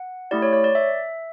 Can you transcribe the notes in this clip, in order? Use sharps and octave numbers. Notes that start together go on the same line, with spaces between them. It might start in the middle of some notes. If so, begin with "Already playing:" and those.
Already playing: F#5
A3 E4 G4 D5
C#5
C#5
D5
E5